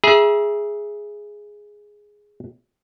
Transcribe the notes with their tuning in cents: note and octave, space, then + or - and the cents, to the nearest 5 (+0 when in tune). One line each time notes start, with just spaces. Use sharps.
G#4 +0 E5 +0 A#5 +45